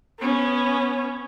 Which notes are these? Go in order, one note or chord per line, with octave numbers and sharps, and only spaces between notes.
B3 C#4